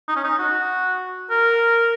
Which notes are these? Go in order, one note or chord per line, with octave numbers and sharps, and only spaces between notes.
D#4
C#4
D#4
F#4
A#4